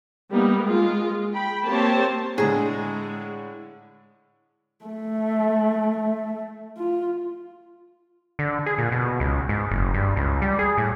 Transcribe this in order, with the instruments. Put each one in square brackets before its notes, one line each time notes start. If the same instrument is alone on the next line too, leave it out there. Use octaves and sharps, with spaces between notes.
[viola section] G3 A#3 B3 D#4
G#3 F4
G5 B5
A#3 C4 G4 C5 C#5 A5
[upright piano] A2 D3 [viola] G#3 [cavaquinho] G#4 A#5
[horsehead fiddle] A3
F4
[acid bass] D3
G#4
A#2
B2
C#2
G#2
F#1
G2
C#2
G3
G#4
A2